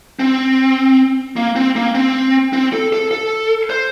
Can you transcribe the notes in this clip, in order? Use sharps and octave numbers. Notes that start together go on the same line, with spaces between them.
C4
A#3
C4
A#3
C4
C4
A4
A4
A4
C5